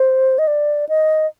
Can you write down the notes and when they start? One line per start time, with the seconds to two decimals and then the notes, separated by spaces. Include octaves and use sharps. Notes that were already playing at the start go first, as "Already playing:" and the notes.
Already playing: C5
0.38 D#5
0.47 D5
0.89 D#5